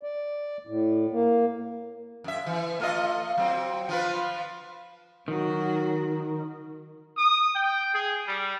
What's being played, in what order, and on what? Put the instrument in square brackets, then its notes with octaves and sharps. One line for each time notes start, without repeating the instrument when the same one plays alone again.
[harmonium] D5
A2
A#3
[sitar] F#2 E5
E3
A3 F4 D#5
F#3 C4
F3 F4 B4
[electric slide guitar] D#3 [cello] F#3 F#4
[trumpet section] D#6
G5
G#4
G3